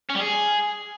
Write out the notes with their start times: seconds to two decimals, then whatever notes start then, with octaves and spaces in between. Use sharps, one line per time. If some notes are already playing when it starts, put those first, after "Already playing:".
0.10 C#4
0.15 G3
0.20 G#4